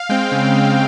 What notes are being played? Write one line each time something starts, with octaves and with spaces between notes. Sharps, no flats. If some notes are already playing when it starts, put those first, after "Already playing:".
Already playing: F5
G#3 C4 G5
C#3
G#3 C4